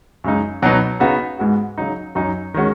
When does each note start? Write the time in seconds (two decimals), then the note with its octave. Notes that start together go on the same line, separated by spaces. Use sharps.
0.24 F#2 C#3 G#3 D#4
0.62 B2 F#3 B3 D#4
1.00 C#3 B3 D#4 F#4
1.39 G#2 G#3 B3 F#4
1.78 C#3 F#3 D#4
2.15 F#2 F#3 D#4 F#4
2.54 D#3 G#3 C#4 F#4